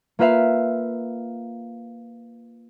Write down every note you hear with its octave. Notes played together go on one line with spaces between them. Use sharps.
A#3 F4 B4 E5 F5